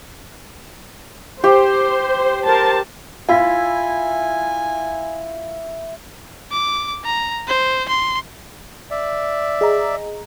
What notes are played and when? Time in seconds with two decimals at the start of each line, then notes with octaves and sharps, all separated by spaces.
1.44 G4 C5
2.45 A#4 C5 A5
3.29 E4 F4 F5 G#5 B6
6.52 D6
7.04 A#5
7.47 C5
7.88 C6
8.91 D5 E5
9.61 G#4 D#5 A#5